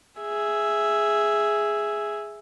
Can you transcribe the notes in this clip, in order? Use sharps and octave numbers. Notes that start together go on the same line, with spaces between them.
G#4 E5